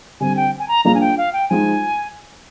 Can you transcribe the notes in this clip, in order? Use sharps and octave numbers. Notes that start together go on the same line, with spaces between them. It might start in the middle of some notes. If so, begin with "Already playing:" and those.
D3 G3 C4 G#5
G5
G#5
A#5
F3 A#3 D4 F4 G#4 A#5
G#5
G5
F5
G5
F3 G#3 D#4 G#5